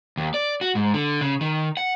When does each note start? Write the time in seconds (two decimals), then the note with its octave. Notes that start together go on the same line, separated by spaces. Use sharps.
0.17 D#2
0.34 D5
0.61 F#4
0.75 G#2
0.94 D3
1.21 C#3
1.41 D#3
1.77 F#5